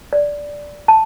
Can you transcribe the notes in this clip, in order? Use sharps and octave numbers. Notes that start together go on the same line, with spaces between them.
D5
A5